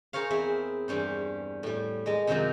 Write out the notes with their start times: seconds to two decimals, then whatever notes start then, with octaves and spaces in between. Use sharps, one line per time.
0.13 G#4 A#4 C5 C#5 F5
0.30 E2 C4 E4 G#4 E5
0.88 E2 G2 G3 C#4 C5
1.63 A2 G3
2.06 G#3 A#4 D#5 A5
2.27 F#2 C3 D#3 F3 F#3 G#3